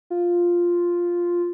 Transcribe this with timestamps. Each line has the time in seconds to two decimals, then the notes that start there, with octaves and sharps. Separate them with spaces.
0.10 F4